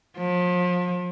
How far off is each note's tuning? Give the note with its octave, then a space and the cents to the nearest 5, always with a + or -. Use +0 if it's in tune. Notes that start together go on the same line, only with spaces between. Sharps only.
F3 +35